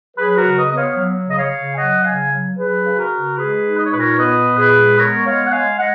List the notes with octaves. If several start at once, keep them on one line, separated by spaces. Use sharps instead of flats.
F#3 G#4 B4
F#4 A#4
C#3
B4 D#5
B3 D#5
C#5 F5
F#3
C#3
D#5
C#5 F5
C#3
G#5
F#3 D#5 F#5
C#3 F5 G#5
F#3
F#3 G#4 B4
C#3
F#4 A#4
C#3
G#3 G#4 B4
D#4
D#5
C#5
A#2 B4
A#4 C#5
B3 B4 D#5
A#2
G#4 B4
G#3
B3 A#4 C#5
G#3 C#5 F5
F#5
G#3 F5 G#5
G#3 D#5 F#5